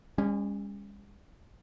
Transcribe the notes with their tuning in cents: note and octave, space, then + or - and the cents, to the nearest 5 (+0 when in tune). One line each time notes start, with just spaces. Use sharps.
G#3 -45 C#4 +0